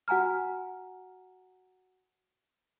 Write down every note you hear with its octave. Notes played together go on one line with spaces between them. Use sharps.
F#4 F#5 G#5 A#5 F6